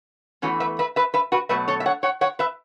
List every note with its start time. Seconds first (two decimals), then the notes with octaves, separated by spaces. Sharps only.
0.42 E2 E3 A3 C#4 F#4
0.60 B4 E5
0.79 B4 E5
0.96 B4 E5
1.14 B4 E5
1.32 F#4 B4
1.49 B2 F#3 A3 B4 E5
1.68 A4 C#5
1.80 E5
1.86 C#5 F#5
2.03 C#5 F#5
2.21 C#5 F#5
2.39 B4 E5